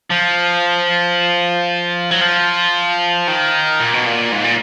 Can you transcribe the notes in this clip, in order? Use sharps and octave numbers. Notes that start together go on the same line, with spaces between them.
F3
F#3
F3
D#3
A#2
B2
A#2
G#2
A#2